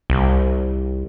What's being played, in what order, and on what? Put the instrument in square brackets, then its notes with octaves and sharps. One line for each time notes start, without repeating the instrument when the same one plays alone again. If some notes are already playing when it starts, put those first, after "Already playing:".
[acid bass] C2